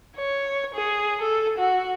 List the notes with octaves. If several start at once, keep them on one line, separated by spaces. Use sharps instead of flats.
C#5
G#4
A4
F#4